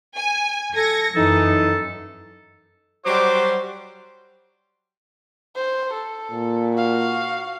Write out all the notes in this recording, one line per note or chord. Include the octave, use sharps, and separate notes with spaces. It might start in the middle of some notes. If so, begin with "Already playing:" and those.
G#5
A4 G#6 A#6 C#7
F#2 E3 D#4 A4
F#3 G3 F#4 C5 C6 D6
C5
A4
A#2
F#4 F5